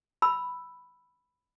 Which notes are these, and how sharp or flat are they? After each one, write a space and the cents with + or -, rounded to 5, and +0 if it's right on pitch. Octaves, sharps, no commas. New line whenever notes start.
B5 +0 E6 +0